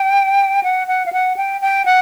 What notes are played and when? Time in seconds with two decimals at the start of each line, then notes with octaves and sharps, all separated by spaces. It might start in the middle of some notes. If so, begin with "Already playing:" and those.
Already playing: G5
0.63 F#5
0.88 F#5
1.06 F5
1.13 F#5
1.37 G5
1.61 G5
1.86 F#5